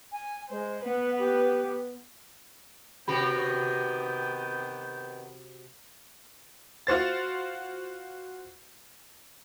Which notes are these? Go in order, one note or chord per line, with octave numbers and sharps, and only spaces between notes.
G#5
G#3 C5
B3 B4 F#5
G4
C3 D#3 B3 F#4 G4 G5 B5
F4 F#4 C5 A6